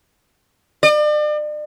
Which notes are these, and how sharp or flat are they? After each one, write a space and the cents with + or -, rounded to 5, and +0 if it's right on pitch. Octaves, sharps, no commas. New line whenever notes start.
D5 +40